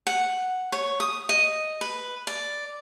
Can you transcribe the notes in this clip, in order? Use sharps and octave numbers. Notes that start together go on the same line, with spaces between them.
F#5
C#5
D#6
D#5
B4
D5